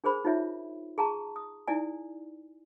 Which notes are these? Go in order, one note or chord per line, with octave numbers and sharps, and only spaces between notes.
D4 G#4 A#4 C5 B5
D#4 F4 C#5 E5
G#4 A5 A#5 C#6
D#6
D#4 E4 D5 G#5